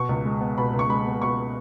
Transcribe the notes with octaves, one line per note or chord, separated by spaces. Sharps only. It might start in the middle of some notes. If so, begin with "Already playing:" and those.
Already playing: B2 C#6
C#2
G#3
B3
B2 B5
C#2
C#6
G#3 B5
B3
B2 C#6